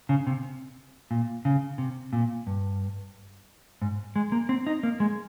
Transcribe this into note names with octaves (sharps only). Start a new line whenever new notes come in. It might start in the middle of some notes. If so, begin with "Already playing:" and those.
C#3
C3
A#2
C#3
C3
A#2
G2
G#2
G#3
A#3
C4
D#4
A#3
G#3